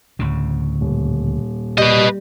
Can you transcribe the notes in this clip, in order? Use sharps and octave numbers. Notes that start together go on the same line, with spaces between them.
D2 A2 C#3
D#1
A#2 G3 B4 D#5